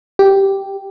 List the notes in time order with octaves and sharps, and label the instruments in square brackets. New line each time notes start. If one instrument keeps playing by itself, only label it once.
[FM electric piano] G4